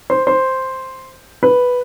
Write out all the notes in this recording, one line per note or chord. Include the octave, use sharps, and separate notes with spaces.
C5
C5
B4